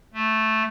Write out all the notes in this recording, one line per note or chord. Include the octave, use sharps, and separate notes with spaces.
A3